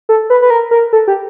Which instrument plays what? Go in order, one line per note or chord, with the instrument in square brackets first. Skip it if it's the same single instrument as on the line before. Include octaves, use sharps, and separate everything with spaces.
[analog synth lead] A4
B4
B4
A#4
A#4
A4
G4